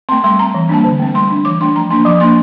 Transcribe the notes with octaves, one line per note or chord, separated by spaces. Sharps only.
A3 C4 C6
G3 C6
C4 A#5
E3
G3 A#3 D4 A5
D3
A3 C4
G3 C6
D4
E3 D6
A3 D4 C6
F3 A#5
A#3 D4 C6
F3 D6
A#3 D4 C6